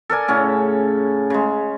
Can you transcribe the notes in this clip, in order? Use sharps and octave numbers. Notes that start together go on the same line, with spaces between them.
A4 A#4 D5 G#5
A2 C#3 C#4
C#3 G#3